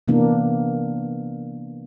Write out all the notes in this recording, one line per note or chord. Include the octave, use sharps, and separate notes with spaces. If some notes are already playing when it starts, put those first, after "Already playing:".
C3 E3 A#3 B3 D4